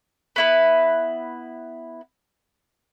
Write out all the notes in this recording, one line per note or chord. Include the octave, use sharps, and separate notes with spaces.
B3 E4 B4